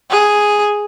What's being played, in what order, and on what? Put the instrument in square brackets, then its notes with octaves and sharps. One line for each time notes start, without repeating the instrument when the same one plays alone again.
[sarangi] G#4